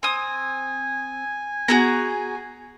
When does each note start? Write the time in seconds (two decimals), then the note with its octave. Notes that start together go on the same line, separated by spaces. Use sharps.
0.03 C4 G#5 D#6
1.68 B3 F#4 G#4 A#5